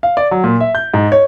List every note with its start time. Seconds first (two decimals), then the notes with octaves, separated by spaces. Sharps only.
0.03 F5
0.17 D5
0.31 F#3
0.44 A#2
0.60 E5
0.75 G6
0.94 G#2
1.12 C#5